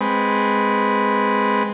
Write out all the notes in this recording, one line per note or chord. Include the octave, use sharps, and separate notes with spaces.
G#3 C4 B4